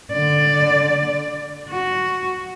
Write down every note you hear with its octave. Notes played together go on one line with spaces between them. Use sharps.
D3 D5
F#4